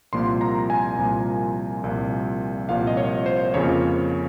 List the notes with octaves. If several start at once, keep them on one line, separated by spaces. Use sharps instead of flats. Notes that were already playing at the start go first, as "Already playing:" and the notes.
C2 A#2 F3 A#3 C6
A#5
G#5
C2 A#2 F3 A#3
C2 A#2 F3 A#3
C2 A#2 F3 A#3 F5
D#5
C#5
C5
F2 C#3 F3 A#3 C#5